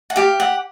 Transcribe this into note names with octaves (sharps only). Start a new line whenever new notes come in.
F#5
G4 F5
F#5